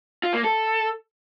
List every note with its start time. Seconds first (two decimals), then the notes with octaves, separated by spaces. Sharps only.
0.23 F4
0.34 A#3
0.44 A4